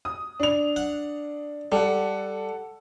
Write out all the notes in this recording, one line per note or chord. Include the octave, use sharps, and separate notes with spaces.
D#6
D4 F7
F#5
G3 A4 F#5